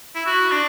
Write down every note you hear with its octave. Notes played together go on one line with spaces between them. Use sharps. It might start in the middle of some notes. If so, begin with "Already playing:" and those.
E4
F#4
D4